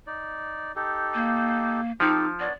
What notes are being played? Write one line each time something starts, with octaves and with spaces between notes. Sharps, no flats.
D#4 D5
D#4 G4 A4
A#3
F3 C4 D#4 G4 A4
B3 D4 C#5 D5